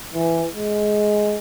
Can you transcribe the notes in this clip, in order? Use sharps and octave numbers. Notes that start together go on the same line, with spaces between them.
E3
G#3